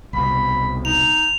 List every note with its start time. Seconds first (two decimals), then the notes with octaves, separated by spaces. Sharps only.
0.13 C2 B2 B5
0.85 D#4 F7